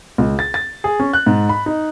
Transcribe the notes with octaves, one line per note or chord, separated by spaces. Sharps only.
C#2
A6
A6
G#4
C#4
F#6
G#2
B5
D#4